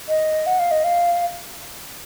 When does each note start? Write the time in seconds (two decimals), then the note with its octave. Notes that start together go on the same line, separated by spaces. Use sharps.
0.08 D#5
0.47 F#5
0.59 F5
0.71 D#5
0.84 F5